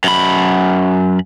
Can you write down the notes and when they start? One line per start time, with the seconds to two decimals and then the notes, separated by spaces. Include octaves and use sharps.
0.04 F#2 B5